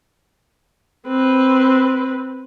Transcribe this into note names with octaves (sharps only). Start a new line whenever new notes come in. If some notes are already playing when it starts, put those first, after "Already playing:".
C4 B4